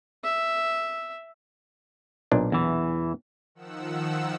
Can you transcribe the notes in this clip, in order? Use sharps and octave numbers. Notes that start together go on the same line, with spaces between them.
E5
B1 A#2 D4
E2 E3
D#3 F3 F#5 E6